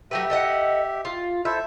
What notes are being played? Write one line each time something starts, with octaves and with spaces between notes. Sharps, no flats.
F#3 A3 G4 B4 E5
A4 D#5 F#5
F4
E4 A4 C5 E5